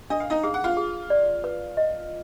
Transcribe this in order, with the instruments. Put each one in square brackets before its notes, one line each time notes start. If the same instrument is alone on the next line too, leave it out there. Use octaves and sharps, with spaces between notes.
[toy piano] D4 [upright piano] D#5
[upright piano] F5
D#4 D#5
[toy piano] G#4 [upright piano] F5
[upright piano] F#5
F4 F5
[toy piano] G#4
D5
B4
D#5